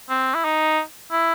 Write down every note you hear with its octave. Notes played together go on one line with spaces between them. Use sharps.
C4
E4
D#4
E4